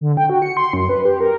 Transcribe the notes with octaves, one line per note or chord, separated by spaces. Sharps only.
D3
G5
F#4
C#7
C6
F#2
B4
G4
A#4